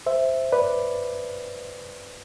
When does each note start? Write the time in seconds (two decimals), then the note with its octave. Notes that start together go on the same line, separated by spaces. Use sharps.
0.06 C5 E5
0.52 B4 D5